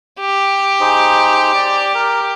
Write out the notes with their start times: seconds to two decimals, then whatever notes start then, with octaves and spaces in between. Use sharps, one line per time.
0.20 G4
0.80 D#4 G#4 C5
1.54 D5
1.95 A#4